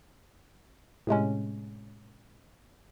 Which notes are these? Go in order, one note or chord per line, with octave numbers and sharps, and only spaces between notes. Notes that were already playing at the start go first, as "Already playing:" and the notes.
A2 C3 G#3 C#4